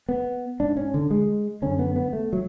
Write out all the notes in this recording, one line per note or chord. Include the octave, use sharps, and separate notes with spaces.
B3
G#2 D4
C#4
D3
G#3
F#2 D3 C#4
B3
B3
A3
F#3